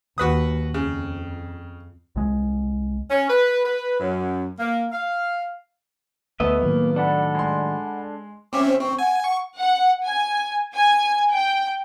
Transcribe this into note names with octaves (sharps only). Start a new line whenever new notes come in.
D#2 F#4 B4 D#6
F2 C#3
C2 G#3
C#4
B4
B4
F#2
A#3
F5
D2 A3 B3 D#5 E5
A2 D#3 F#3 A#3
D4 A4 D5 F#5 B5
G#3 C6
C4 C#4 E5 D6
C5
C4 C#6
F#5 G#5
F#5 C#6
F#5
G#5
G#5
G5